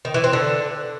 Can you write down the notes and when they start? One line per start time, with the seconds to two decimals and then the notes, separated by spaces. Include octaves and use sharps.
0.05 D#3
0.14 E3
0.24 C4
0.33 D3